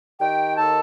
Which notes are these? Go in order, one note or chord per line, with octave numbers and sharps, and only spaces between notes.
D#3 G4 G5
D#2 A4 A5